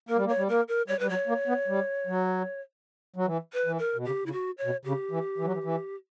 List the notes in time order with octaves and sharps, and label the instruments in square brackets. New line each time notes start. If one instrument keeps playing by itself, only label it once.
[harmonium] A#3 [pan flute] A#4
[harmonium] G3
A#3
[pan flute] C#5
[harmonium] G3
[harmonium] A#3 [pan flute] A#4
[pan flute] A#4
[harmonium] G3 [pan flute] C#5
[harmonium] G3 [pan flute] B4
[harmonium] F#3 [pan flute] C#5
[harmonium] A#3
B3
G3
F#3
F#3
E3
[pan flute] B4
[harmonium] E3
[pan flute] A#4
[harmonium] B2
[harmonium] C#3 [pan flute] G4
[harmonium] C#3 [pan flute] E4
[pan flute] F#4
C#5
[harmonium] B2
[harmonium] C#3 [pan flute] G4
[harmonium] E3
E3
F#3
E3
E3